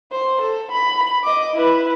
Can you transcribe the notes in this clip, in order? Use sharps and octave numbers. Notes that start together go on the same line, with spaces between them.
C5
A4
B5
D#5 D6
E4 B4